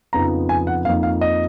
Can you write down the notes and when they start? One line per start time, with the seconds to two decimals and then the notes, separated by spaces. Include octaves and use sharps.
0.13 F2 C#3 F3 B3 D#4 A#5
0.49 G#5
0.67 F#5
0.85 F2 F3 A#3 D#4 F5
1.03 F5
1.21 D#5